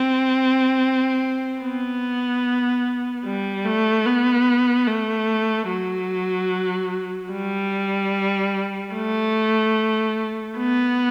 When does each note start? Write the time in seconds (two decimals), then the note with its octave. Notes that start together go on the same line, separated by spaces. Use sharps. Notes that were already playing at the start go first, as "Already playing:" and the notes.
Already playing: C4
1.62 B3
3.25 G3
3.65 A3
4.05 B3
4.87 A3
5.69 F#3
7.32 G3
8.94 A3
10.58 B3